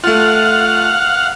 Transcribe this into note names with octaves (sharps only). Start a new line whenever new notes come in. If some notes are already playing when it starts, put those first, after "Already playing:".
A3 F4 F5 F#5